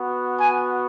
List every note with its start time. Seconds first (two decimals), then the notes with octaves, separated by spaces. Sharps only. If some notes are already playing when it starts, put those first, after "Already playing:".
Already playing: B3 F#4
0.39 G#5